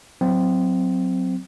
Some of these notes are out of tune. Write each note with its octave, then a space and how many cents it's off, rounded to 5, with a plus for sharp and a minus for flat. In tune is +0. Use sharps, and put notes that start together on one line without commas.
F#3 -5 C4 -15